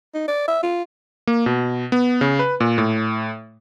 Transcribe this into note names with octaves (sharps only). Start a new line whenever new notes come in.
D#4
D5
E5
F4
A#3
B2
B3
C#3
B4
A#2
A2